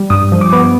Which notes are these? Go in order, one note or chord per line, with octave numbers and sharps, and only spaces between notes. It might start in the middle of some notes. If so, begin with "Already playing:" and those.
Already playing: G3
G2 D#6
F3
D6
B3